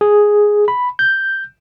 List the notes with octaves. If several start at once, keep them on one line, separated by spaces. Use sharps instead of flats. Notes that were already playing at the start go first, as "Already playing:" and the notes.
G#4
B5
G6